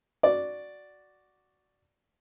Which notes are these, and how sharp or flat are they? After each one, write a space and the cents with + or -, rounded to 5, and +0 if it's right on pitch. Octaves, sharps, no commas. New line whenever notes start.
F#4 +0 D5 +0